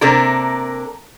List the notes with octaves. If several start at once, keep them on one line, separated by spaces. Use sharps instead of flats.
C3 A#3 D4 A4 A#4